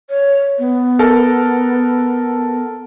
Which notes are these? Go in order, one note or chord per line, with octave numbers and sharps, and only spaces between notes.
C#5
B3
A4 A#4